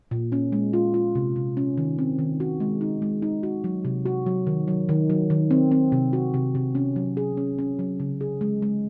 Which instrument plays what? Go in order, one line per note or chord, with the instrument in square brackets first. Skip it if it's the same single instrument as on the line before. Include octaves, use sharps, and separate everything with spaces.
[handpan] A#2
C#4
G#3
F4
F4
C3
C3
C#4
D#3
C4
D#3
F#4
G#3
D#4
G#3
D#4
F#4
F#3
C3
F#4
F#3
D#3
F#3
D#3
F#3
D#3
C4
C4
C3
F#4
C3
C3
C#4
F#3
G#4
C#4
C#4
F#3
C#3
G#4
G#3
G#3